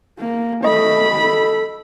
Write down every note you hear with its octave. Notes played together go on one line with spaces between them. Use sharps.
A#3
A3 D#5 B5
A4